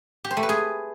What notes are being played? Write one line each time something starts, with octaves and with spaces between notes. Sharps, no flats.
G4
C5
A3
B4
G#4